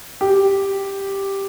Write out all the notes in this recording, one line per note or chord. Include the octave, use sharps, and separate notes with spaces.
G4